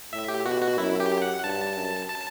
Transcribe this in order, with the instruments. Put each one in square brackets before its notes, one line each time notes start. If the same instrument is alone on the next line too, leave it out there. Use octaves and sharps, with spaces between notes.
[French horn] A2 [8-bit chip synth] E5
[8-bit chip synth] G4
[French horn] B2 [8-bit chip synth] F#4
[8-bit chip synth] F#4
[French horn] F#2 [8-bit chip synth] E4
[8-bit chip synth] G4
F#5
[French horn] G2 [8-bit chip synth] A5
[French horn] F#2
[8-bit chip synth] A5